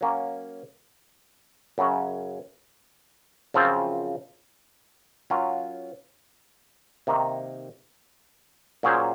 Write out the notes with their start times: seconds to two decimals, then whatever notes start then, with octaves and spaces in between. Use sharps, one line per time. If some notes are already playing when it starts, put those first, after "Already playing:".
0.01 F#3 A#3 C#4
1.78 F#2 C#3 F#3 C#4
3.54 F#2 C#3 F3 C4 F4
5.30 F#3 C#4 F4 A#4
7.07 C3 D#3 A#3 D#4
8.83 A#2 F#3 C#4 G#4 C5